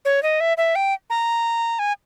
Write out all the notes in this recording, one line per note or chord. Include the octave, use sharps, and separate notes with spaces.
C#5
D#5
E5
E5
G5
A#5
G#5